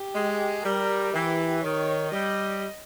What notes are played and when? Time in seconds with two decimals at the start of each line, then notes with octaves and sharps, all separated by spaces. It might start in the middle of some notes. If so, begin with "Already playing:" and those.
Already playing: G4
0.15 G#3
0.64 G3 A#4
1.14 E3 G4
1.63 D#3 C#5
2.12 G3 D#5